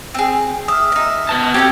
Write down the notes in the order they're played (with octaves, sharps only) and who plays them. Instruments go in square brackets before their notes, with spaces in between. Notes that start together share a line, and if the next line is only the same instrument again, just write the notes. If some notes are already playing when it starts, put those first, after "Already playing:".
[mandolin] C4 G#4
[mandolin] E5 [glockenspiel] D#6 F6
[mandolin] D#4 E5
[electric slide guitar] B3 B4 A5
[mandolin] C4 F#4 A4 [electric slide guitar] G4 [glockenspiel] G#6